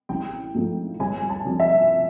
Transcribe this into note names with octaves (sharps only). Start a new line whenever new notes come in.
A1 G5
G#2 F3 A3
G1 G#5
A5
F2 D3
E5